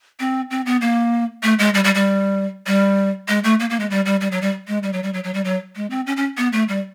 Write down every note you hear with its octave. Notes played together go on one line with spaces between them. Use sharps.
C4
C4
B3
A#3
A3
G#3
G3
G3
G3
G3
G#3
A3
A#3
A#3
G#3
G3
G3
G3
F#3
G3
G#3
G3
F#3
G3
F#3
F#3
G3
F#3
G#3
C4
C#4
C#4
B3
A3
G3